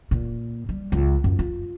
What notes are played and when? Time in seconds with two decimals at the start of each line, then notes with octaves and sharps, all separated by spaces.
0.11 A#2
0.69 G3
0.92 C#2
1.24 F#2
1.39 F4